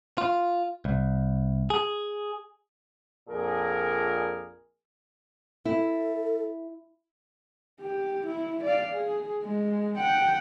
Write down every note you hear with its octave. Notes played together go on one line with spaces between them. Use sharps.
F4
C2
G#4
A#1 F2 A#2 G#4 A#4
E4 A4
G4
E4
D5 F5
G#4
G#3
F#5 G5